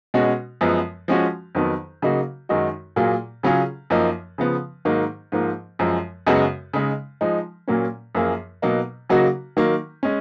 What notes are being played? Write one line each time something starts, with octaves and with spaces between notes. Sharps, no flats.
B2 G#3 C#4 F#4
F#2 F3 G#3 B3
F3 G#3 C#4 F#4
F2 D#3 F#3 B3
C#3 F#3 A#3 D#4 F#4
F#2 D#3 G#3 D#4 F#4
A#2 F#3 A#3 F4 G#4
C#3 F#3 C#4 F4 G#4
F#2 F3 A#3 D#4
C#3 F3 B3
G#2 D#3 F#3 A#3 D#4
G#2 F3 A#3
F#2 F3 G#3
F#2 C#3 G#3 B3 F#4
C#3 G#3 D#4
F3 G#3 D#4
A#2 F#3 A#3 C#4
F#2 F3 A#3 F4 G#4
B2 F#3 A#3 D#4
C#3 F#3 A#3 D#4 F#4
D#3 F#3 A#3
G#3 C#4